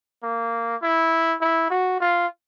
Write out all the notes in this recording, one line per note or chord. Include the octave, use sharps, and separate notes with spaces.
A#3
E4
E4
F#4
F4